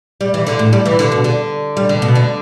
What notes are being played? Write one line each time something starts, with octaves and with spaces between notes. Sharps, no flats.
G3
E3
D3
A2
G3
E3
D3
B2
D3
G3
D3
B2
D3